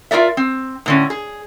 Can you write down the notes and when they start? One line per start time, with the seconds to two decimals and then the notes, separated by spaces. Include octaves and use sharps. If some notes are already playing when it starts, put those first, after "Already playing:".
0.11 F4 F#4 A#4 D5 E5
0.37 C4
0.86 A2 D3 C#4
1.10 G#4